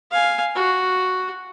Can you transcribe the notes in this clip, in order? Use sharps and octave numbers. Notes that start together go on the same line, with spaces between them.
F5 G#5
F#4